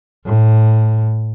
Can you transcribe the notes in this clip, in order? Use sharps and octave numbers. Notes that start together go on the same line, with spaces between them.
A2